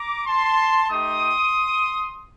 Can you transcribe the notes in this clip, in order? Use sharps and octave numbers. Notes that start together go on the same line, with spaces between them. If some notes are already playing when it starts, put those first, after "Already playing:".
Already playing: A#5 D6
A5 C6
A3 D#4 G4 C6 D#6